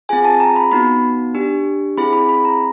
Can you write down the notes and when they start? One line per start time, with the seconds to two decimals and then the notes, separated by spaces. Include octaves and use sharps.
0.09 C4 F4 G#4 G#5
0.25 A5
0.40 A#5
0.56 B5
0.71 B3 D#4 F#4 B5
1.35 D4 G4
1.98 C4 E4 G#4 B5
2.13 B5
2.29 B5
2.45 A#5